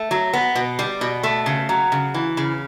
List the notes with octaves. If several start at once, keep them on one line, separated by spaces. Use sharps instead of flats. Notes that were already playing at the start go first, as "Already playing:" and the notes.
Already playing: A3
F#3
B3
B2
G3
B2
A3
C#3
F#3
C#3
E3
C#3